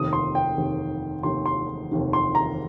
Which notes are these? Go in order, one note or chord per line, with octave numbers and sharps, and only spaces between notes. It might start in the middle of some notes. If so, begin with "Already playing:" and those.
Already playing: F1 D#2 D#3 D#6
C6
G5
F1 D#2 D#3
F1 D#2 D#3 C6
C6
F1 D#2 D#3
C6
A#5